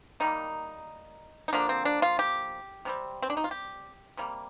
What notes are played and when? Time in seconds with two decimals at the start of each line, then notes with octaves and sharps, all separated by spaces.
0.20 D#3 G3 A#3 D#4
1.48 D#4
1.53 D3 F3 A#3 D4
1.69 C4
1.85 D4
2.02 F4
2.19 G4
2.85 C3 G3 C4
3.22 C4
3.30 D4
3.37 D#4
3.44 F4
3.51 G4
4.17 C3 G3 A#3